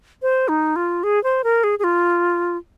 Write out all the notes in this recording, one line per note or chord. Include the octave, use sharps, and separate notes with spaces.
C5
D#4
F4
G#4
C5
A#4
G#4
G#4
F4